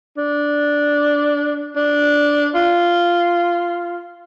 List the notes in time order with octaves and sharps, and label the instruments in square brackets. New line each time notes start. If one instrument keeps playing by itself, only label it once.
[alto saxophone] D4
D4
F4